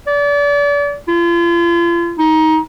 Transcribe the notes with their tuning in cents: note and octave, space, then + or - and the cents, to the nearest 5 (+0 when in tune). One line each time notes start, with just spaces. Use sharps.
D5 -35
F4 -40
D#4 +20